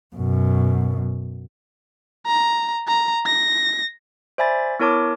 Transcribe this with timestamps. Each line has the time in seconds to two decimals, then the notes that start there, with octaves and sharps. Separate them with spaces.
0.16 F#2 B2
2.27 A#5
2.88 A#5
3.26 A#6
4.38 C5 D5 E5 G#5 B5 A6
4.80 B3 E4 A#4 C#5 A5 D6